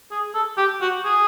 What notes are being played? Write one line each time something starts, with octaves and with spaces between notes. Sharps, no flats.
G#4
A4
G4
F#4
G#4